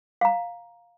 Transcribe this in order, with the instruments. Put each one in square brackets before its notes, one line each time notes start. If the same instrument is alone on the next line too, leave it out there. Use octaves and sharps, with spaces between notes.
[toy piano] F5 A#5